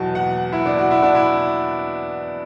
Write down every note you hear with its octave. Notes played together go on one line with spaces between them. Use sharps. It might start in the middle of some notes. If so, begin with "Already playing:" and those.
Already playing: E2 B2 F#3 A5
F#5
E4
D4
F#4
E4
D4
E4